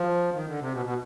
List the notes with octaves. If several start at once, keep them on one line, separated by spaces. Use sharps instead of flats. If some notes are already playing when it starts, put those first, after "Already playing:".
Already playing: F3
D#3
D3
C3
B2
B2